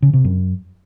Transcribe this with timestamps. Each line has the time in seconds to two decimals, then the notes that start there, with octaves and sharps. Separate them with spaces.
0.02 C#3
0.14 C3
0.25 F#2